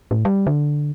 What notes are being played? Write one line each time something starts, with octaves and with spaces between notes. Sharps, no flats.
A2
G3
D3